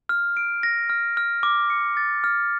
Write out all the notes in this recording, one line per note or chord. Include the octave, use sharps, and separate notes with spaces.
F6
D7
A#6
F6
F6
D6
C#7
A6
F6